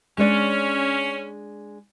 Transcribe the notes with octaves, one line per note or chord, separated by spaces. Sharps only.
G#3 C#4 D4 D5